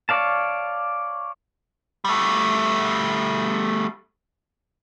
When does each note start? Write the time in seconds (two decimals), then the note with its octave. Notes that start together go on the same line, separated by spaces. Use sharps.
0.09 C#5 D5 F5 A5
2.05 G3 A3